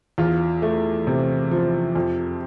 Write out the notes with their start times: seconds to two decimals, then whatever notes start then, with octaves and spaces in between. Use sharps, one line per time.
0.18 E2 F4
0.62 A3
1.07 C3
1.51 F3
1.96 F2